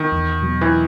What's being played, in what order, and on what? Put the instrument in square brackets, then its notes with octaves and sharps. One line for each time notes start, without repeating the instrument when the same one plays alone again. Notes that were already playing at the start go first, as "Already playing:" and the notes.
Already playing: [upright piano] D#3
[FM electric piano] E2
B2 F#3
[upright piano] E3